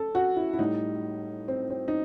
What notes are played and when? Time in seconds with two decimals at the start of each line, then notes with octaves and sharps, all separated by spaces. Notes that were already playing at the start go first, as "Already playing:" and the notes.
Already playing: A4
0.15 F#4
0.36 E4
0.53 E4
0.59 A2 G3 D#4
1.48 C4
1.70 C4
1.88 D#4